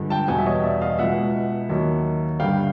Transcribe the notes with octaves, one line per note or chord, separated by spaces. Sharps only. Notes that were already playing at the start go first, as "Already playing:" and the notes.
Already playing: G2 D3 F3 G#3
G5 A5
E2 B2 G3 F#5 G#5
E5
C#5 D#5
D5 E5
D#5 F5
C#2 B2 G#3 E5 F#5
D#2 D#3 F#3
G2 D3 G3 F5 G5